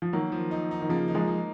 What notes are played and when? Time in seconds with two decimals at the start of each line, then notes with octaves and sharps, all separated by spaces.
0.02 F3
0.13 D#3 F#3 A#3
0.32 F3
0.51 D#4
0.71 D#4
0.81 D#3
0.89 C#3 F3 A#3
1.08 D#4
1.14 F3 G#3
1.27 D#4